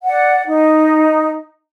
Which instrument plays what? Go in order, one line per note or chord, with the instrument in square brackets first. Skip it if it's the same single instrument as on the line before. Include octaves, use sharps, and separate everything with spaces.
[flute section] D5 F#5
D#4